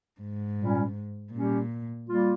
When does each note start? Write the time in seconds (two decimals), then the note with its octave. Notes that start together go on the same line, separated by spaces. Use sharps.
0.21 G#2
0.58 A#2 G3 C#4
1.33 A#2 G3 C#4 G4
2.08 G3 A#3 F4